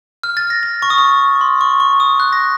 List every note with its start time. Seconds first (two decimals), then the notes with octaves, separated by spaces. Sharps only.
0.23 F6
0.37 A6
0.50 A#6
0.63 A6
0.82 C#6
0.90 D#6
0.98 C#6
1.41 C6
1.61 C#6
1.80 C#6
2.00 D#6
2.20 F#6
2.33 A#6